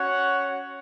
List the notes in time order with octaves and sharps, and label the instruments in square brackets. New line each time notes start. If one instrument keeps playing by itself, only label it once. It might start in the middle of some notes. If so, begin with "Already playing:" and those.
Already playing: [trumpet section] C#4 F#4 C#5 F#5